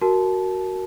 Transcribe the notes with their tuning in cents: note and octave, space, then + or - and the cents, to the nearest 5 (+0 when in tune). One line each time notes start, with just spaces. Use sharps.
F#4 +10 A#4 +0 A5 -20